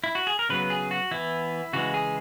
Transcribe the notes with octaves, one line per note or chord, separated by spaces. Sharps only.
E4
F#4
G#4
A#4
C#3 F#3 B3 B4
G#4
F#4
E3 B3 E4
C#3 E3 G#3 F#4
G#4